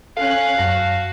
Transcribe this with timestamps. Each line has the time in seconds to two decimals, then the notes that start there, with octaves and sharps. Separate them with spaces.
0.17 C#4 A4 F5 F#6
0.58 F#2 F#4 A5 A#6